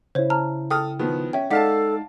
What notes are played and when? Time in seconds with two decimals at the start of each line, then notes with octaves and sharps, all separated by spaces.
0.15 C#3 E4 C5 C#5
0.30 A5 A#5 F6
0.71 A4 G5 D#6 F6
0.99 D#3 F3 B3
1.33 C#4 E5 G5
1.51 G#3 D#4 A4 D5 F5 F#5 A5 B6